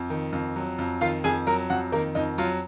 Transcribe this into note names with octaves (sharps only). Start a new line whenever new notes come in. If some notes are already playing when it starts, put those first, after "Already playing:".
Already playing: F2
D#3
F2
F#3
F2
D#3 F4 F5
F2 G#4 G#5
F#3 A#4 A#5
F2 F#4 F#5
D#3 A#3 A#4
F2 D#4
F#3 F4